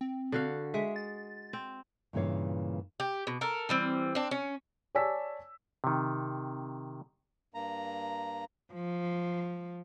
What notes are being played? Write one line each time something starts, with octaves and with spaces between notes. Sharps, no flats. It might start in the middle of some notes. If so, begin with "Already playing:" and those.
C4
D3 F#4 F5
G#3 E5
A6
C4
G2 A#2 C#3 E3 C#5 F5
G4
B2
A4 A#4
E3 G3 C4
C4 D4
C#4
C#5 D5 G#5 A5 E6 B6
C3 D#3
G2 A#3 A#5
F3